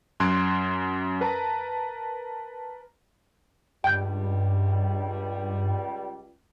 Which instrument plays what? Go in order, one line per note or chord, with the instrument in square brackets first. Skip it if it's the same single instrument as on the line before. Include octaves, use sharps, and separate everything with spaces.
[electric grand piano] F#2 C6 F#6 G#6 D7
A#4 B4 A5 A#5
[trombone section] C#2 G3 [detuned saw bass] G2 [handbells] G5 G6